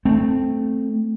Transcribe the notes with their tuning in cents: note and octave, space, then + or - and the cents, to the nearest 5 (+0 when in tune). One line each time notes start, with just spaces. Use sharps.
A3 +0 C4 +0